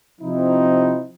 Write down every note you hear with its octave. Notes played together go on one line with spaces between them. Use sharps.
C3 F3 C4 D#4 E4